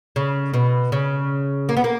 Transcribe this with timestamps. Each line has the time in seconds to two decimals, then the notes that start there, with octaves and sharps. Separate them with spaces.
0.16 C#3
0.54 B2
0.92 C#3
1.69 A#3
1.77 B3
1.84 A#3